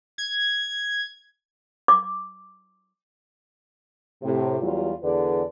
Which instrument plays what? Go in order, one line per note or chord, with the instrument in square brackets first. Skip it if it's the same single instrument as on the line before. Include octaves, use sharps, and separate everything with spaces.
[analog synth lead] G#6
[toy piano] D6
[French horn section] A2 C3
E2 F#3 G3 F4
E2 D3 G#4 B4 D5